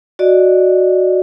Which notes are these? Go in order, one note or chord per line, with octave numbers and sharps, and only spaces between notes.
F#4 D5 D#5